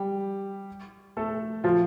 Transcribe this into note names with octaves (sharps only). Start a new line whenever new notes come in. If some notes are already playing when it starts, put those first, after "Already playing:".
Already playing: G3 G4
A3 A4
F3 F4